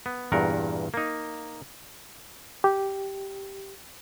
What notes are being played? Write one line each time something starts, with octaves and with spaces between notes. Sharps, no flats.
B3
E2 G2 A#2 A#4 F#5
A#3 D#4
G4